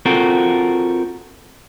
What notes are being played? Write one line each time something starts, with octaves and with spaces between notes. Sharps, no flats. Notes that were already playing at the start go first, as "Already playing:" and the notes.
C4 F4 F#4 A4 A#4